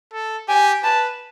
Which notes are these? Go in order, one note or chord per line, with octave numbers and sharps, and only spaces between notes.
A4
G4 G#5
B4 A5